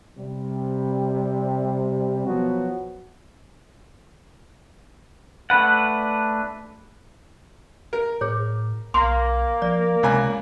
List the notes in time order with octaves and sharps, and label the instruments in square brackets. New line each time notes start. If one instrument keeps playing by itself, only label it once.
[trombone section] C3 G3
B2 F3 F#3 B3 F#4
[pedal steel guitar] A3 D4 B4 F#5
[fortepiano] A#4
[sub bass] A2 [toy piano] G#4 C#5
[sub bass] B1 [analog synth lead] A#3 [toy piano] C6
[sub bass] F3 [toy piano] D5
[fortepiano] C#2 G#5 [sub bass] C3